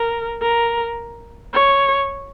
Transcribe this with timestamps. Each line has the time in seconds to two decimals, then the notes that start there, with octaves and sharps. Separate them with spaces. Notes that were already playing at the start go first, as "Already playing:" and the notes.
Already playing: A#4
0.42 A#4
1.54 C#5